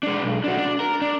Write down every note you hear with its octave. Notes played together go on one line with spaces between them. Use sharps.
G#3 D4
B1
D4 F#4
D4
A#4
D4